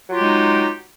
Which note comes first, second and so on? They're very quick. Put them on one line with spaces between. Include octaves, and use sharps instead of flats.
F#3 F4 G4 G#3 D#4